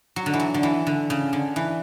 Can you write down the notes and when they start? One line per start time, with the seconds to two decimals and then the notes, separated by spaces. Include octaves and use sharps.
0.16 F#3
0.26 D3
0.33 E3
0.40 F#3
0.54 D3
0.63 E3
0.87 D3
1.10 C#3
1.33 D3
1.56 E3